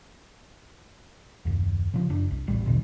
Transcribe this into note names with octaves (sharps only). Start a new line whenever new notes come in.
F#1 D#2
C#3 F3
F#1 D4
C2
D#1 A1 G3
D#2 B2 D3 E3